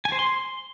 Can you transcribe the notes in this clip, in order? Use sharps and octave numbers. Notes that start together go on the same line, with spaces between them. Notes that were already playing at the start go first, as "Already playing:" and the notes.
G#5
C5
C6